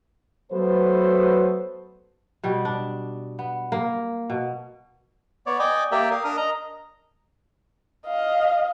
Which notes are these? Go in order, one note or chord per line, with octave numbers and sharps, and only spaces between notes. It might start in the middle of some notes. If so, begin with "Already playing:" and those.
F#3 A3 B3 A4 B4 C5
B2 G3
D4
B3
A#3
B2
B3 C#5 D5
D5 D#5 G5 G#5 D6
A#3 G4 A#4 D5 E5 G5
A#4 F5 D#6
D4 A#4 D#6 F6
D#5 A#5
D#5 F5